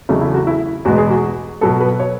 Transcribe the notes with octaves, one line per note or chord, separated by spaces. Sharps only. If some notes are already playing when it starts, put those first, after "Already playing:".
E2 C#3 F#3 A3 D#4
E4
F#4
E4
E2 B2 G#3 B3 F#4
G#4
F#4
B2 F#3 B3 A4
B4
C#5